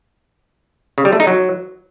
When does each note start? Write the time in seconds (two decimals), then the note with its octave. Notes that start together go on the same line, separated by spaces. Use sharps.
0.98 C#3
1.05 G3
1.12 A3
1.20 D#4
1.27 F#3